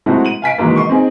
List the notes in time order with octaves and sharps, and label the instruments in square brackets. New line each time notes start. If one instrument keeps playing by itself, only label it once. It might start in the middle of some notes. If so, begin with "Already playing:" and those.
[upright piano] F#3 G#3 A3 C4 E4 F#4
D#7 F#7
F5 G#5 B6 D7
D#3 E3 F#3 G#3 A#3
D#5 C6 C#6
C4 D#4 G#4